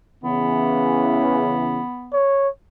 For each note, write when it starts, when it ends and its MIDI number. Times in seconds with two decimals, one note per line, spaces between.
0.24 1.81 49
0.24 1.81 52
0.24 2.17 59
2.13 2.49 73